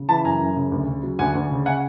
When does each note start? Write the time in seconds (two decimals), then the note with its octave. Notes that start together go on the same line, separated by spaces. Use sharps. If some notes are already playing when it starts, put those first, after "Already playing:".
Already playing: C#3
0.09 E3 A5 B5
0.24 F#2 G#5 A#5
0.41 F#2
0.56 C#3
0.72 D2
0.88 C#3
1.03 F#3
1.19 D2 F#5 G#5
1.35 D2
1.51 C#3
1.66 F#5 G#5